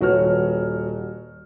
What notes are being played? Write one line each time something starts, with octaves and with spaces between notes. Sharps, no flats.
D#1 F#4 B4 C#5 F6